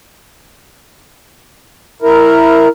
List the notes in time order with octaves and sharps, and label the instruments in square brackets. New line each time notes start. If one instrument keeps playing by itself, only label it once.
[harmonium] E4 A#4